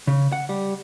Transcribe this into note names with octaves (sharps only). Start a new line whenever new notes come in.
C#3
F#5
G3